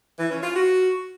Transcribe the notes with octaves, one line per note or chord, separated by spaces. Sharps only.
E3
C#4
F4
F#4